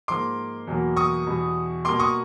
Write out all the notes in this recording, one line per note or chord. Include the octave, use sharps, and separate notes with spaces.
G#2 F3 A#3 C6 D6
E2 B2 F#3 A#3
C#6 D#6
E2 B2 G3
B2 G3 A#3 C6 D6
C#6 D#6